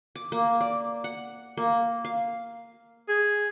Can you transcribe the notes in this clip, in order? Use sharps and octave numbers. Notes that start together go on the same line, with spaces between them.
D6
A#3
D5
F#5
A#3
F5
G#4